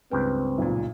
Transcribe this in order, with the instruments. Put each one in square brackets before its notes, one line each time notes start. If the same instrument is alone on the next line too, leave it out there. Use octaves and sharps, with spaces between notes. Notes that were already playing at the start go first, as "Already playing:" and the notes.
[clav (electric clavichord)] C#2 G2 G5 [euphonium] C4 [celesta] B4
[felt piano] B1 A#2